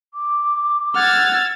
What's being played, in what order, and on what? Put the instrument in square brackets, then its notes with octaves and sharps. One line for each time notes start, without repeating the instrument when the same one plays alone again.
[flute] D6
[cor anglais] F#5 [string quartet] E6 G#6 A6 [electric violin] F6